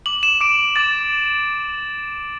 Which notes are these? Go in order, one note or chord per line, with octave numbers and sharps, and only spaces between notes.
D6 F#7
E7
D6 D7
D6 A6